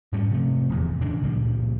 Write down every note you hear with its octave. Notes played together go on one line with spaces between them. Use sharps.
G#2 G3 A#3 C#4
C3 F3 A3
D1 E2 C#3
C#3 E3 G#3 D4
C#2 G2 A#2 F3